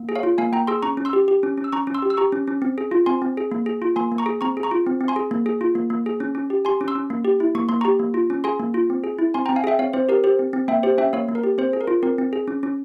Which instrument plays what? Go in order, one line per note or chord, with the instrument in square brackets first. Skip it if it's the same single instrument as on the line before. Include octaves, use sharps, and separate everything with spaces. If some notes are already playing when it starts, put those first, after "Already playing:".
Already playing: [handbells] A#3
G#4
C#5 F5
F4
A#3 F5 G#5
A#3 G5 A#5
G#4 C6 E6
C#4 A#5 C#6
C#4
C6 E6
G4
G4
C#4
C#4
E6
C#4 A#5 C#6
C#4
C6 E6
G4
E6
G4 A#5 C#6
C#4
C#4
C4
G#4
F4
C4 G#5 C6
C4
G#4
A#3
G#4
F4
A#3 G#5 C6
A#3
A#5 C#6
G#4
C4 A#5 C#6
G#4
A#5 C#6
F4
C4
C4
G#5 C6
G#4
A#3
G#4
F4
A#3
A#3
G#4
C#4
C#4
G4
G4 G#5 C6
C#4
C6 E6
C#4
A#3
G4
E4
A#3 C#6
A#3 C6
G4 A#5 C#6
A#3
F4
C#4
G#4 G#5 C6
A#3
F4
C4
G#4
E4
C4 G#5 C6
G5 A#5
C4
F5 G#5
G#4 E5 G5
C4 C#5 F5
C4 C5
G4 A#4
G4 C5
C4
C4
A#3 E5 G5
G4 C5
C#4 E5 G5
A#3 C#5 F5
A#3
A#4
G4
C4 C5
G#4
A#4
F4
C4 A#4
C4
G#4
C#4
C#4